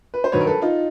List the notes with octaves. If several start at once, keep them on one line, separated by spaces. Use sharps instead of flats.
B4
C5
G2 D#3 F#3 B4 C#5
A#4
A4 B4
D#4 F4